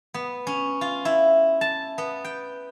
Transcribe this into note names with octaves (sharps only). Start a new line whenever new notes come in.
B3
C#4
F4
E4
A5
B3
G5